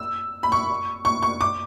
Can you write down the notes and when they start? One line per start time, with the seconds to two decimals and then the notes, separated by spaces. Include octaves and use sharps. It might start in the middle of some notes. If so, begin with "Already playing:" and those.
Already playing: E6
0.43 B5
0.52 C#6
1.05 C#6
1.22 C#6
1.41 D6